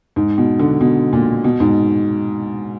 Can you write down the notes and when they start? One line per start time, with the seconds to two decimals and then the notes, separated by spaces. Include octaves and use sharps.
0.16 G#2
0.38 B2
0.59 D3
0.81 B2
1.13 A#2
1.44 B2
1.60 G#2